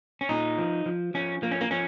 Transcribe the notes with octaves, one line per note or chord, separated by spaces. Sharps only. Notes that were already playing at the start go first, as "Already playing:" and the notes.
C#4
A#2 D#4
F3
F3
F3 C#4
F3 A#3
C#4
A#3
F3 C#4